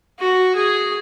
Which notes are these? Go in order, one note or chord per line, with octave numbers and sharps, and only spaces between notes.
F#4
G#4